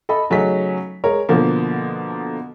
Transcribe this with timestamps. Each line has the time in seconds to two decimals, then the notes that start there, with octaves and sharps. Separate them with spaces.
0.09 A4 D#5 B5
0.30 C#3 F#3 A3 C#4 D#4 B6
1.04 G#3 A#4 C#5
1.29 B2 D3 F3 A#3